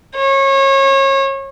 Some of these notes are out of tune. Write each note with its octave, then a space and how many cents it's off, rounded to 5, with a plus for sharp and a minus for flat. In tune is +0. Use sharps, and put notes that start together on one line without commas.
C#5 -30